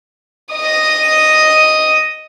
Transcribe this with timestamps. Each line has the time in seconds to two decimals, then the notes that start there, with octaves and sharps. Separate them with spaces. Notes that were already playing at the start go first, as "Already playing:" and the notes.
0.54 D#5 D#6